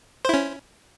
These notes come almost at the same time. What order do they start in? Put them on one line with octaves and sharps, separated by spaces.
C5 E4 C#4